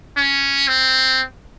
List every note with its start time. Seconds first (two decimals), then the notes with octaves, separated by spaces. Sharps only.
0.17 C#4
0.68 C4